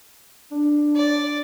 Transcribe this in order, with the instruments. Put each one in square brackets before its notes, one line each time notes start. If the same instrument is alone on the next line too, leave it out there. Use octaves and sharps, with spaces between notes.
[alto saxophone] D4
[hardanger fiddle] D5